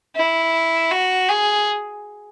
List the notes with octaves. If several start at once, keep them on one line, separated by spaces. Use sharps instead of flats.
E4
F#4
G#4